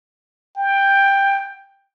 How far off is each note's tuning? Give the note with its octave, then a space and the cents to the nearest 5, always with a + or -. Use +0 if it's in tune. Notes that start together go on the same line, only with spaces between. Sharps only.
G5 +10